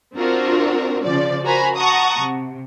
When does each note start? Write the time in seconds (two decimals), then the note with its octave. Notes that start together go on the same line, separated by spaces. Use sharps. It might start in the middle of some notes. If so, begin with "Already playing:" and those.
0.16 C4 D4 F4 F#4 A#4
1.03 C#3 F3 D5
1.44 F#4 A#4 C5 G#5 A#5 B5
1.76 F#5 A5 A#5 C#6 D#6
2.16 C3